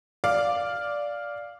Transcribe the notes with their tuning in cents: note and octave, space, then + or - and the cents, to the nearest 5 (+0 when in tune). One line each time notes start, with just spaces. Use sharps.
D5 -5 F5 +0 D6 +0